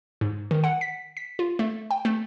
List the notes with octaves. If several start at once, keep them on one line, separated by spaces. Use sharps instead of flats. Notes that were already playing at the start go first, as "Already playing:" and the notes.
G#2
D#3
F#5
B6
B6
F4
A3
G5
A3